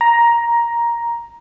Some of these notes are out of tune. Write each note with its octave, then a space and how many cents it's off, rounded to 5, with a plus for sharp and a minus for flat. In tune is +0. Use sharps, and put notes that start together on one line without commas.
A#5 +10